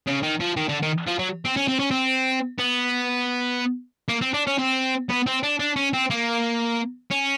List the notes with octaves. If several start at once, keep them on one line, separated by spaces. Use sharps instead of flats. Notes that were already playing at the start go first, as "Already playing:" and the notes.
C#3
D#3
F3
D#3
D3
D#3
F3
F#3
C4
C#4
C4
C#4
C4
B3
A#3
C4
D4
C#4
C4
B3
C4
D4
D4
C#4
C4
A#3
C#4